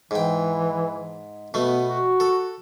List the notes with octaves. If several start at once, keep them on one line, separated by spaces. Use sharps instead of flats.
G#2 E3 G5
B2 A3 B3
F#4
A4